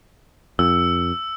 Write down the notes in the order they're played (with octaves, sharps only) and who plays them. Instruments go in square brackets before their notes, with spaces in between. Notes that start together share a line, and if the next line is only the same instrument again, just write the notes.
[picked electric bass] F2 [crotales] E6